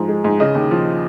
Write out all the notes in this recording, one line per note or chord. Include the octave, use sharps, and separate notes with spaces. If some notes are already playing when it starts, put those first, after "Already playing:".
Already playing: G#2 F3
G#3
G#2
C#3 D#5
D#2
F3